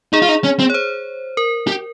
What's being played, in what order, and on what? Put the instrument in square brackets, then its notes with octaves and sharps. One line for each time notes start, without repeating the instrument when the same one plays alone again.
[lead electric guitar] D#4 [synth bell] G#4
[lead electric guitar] F4
D#4
C#4
C4
[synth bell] C#5
C5
A#4
[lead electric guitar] G4